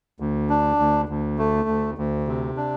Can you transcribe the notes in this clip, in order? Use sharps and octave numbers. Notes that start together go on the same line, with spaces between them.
D2
D4
D2
D2
A3
D2
D2
C3
D4